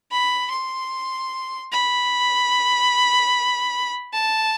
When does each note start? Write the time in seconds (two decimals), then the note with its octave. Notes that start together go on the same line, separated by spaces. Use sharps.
0.12 B5
0.51 C6
1.73 B5
4.14 A5